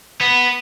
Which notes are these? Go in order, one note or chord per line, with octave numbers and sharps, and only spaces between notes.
B3